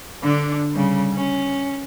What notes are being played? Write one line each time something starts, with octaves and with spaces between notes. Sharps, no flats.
D3 D4
C#3 G3
C#4